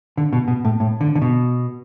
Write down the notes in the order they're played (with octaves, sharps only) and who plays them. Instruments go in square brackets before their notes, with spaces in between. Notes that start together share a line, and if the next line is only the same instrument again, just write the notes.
[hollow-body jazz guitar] D3
B2
B2
A2
A2
D3
D3
B2